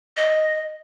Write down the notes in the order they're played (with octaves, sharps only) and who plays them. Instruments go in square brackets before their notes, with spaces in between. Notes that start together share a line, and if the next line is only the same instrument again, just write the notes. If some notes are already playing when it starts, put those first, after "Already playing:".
[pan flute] D#5